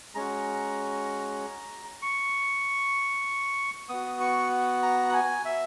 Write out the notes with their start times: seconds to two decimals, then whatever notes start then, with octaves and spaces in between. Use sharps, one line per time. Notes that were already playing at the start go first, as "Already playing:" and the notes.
0.15 G#3 C#4 F#4 A#5
2.02 C#6
3.89 B3 F#4 D#6
4.20 C#6
4.83 A#5
5.09 F#5
5.14 G#5
5.45 E5